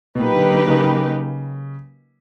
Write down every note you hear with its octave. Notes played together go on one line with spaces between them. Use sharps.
B2
A#2 F#3 A#3 D#4 G4 B4
D3
D3
C#3
C#3